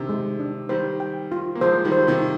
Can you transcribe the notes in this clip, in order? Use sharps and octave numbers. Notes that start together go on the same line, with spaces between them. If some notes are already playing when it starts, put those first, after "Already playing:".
Already playing: C3 D#3 D4
G#3
D4
D#3 G3 C5
G5
F4
A#3
F3 G#3 C5
D#3 G3
C5
C3 D#3